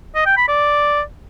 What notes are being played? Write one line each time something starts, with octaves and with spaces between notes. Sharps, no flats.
D#5
G5
B5
D5